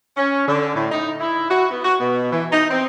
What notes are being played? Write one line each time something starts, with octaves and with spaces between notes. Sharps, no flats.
C#4
D3
A2
D#4
E4
F#4
B3
F#4
B2
E3
D#4
C4